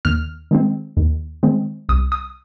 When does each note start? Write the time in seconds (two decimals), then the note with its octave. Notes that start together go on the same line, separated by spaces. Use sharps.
0.05 D#2 F6
0.51 D#3 G#3 C4
0.97 D#2
1.43 D#3 G#3 C4
1.89 C2 D#6
2.12 D#6